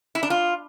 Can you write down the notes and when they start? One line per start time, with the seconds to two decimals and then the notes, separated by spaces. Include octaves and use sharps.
0.15 E4
0.23 D4
0.30 F4